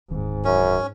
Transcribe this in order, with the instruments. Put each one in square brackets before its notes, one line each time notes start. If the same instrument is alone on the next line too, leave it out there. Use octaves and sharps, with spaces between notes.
[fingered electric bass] D1 D#3 C4 [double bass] G#2
[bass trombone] F#2 [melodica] C#4